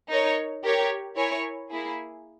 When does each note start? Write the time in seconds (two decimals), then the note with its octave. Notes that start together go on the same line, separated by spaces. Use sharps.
0.09 D#4 A#4 C#5
0.63 G4 A#4 C#5
1.16 E4 A#4 C#5 G#5
1.69 A#3 E4 G#4